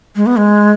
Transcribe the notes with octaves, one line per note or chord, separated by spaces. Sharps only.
G#3
B3
G#3